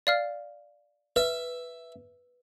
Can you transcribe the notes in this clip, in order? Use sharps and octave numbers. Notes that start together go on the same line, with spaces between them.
D5 F5 F6
B4 E5